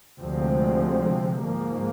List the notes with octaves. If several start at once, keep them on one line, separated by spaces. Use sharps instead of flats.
D2 C3 F3 G#3 C4
G#2 F3 A#3